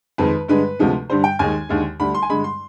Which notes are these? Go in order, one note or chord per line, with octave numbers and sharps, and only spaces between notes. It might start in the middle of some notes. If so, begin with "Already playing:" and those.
F2 D#3 G#3 B4
G2 D3 G#3 B4
D2 C3 F3 G#3
G2 D3 G3 C5
G5
D#2 D#3 G#3 G#5
D#2 D3 G#3
D2 D3 G3 B5
C6
G#5
G2 D3 G#3 B5
C6